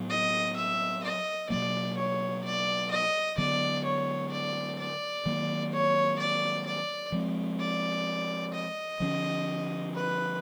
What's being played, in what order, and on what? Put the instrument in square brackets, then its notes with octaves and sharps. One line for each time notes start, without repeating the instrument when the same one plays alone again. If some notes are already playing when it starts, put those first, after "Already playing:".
Already playing: [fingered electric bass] A2 F#3 B3
[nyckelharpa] D#5
E5
D#5
[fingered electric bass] B2 F#3 A#3 [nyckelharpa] D5
[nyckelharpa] C#5
D5
D#5
[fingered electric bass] D3 F#3 B3 [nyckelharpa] D5
[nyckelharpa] C#5
D5
D5
[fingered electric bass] D#3 F#3 A#3
[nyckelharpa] C#5
D5
D5
[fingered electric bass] F3 G#3 C4
[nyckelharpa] D5
D#5
[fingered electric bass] D3 F3 A3 C#4
[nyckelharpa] B4